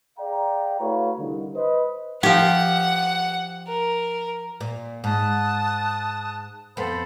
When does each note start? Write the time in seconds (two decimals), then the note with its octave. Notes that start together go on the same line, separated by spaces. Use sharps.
0.19 G#4 D5 F5 G5 A#5
0.80 A3 E4 F#4 B4 C#5 F5
1.18 C2 D3 D#3
1.55 B4 C5 D#5
2.23 F3 G4 F#5
3.68 A#4
4.61 A#2
5.04 G#2 A5 D#6 F#6
6.77 F2 B3 A4 C5 B5